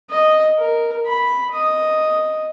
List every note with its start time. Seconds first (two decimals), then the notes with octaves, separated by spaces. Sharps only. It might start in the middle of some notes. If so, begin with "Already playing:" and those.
0.10 D#5
0.58 A#4
1.07 B5
1.51 D#5 D#6